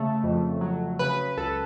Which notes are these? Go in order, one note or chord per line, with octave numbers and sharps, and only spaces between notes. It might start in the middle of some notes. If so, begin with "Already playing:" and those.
Already playing: C#3 A3
F2
F#3
C#3 B4
C#2 A4